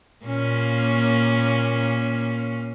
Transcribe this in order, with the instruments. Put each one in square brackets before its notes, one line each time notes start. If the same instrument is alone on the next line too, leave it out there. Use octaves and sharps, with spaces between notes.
[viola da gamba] A#2 A#3 C#4